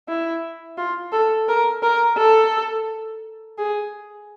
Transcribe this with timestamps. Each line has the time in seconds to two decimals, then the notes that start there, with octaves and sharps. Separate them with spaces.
0.08 E4
0.78 F4
1.12 A4
1.48 A#4
1.83 A#4
2.17 A4
3.58 G#4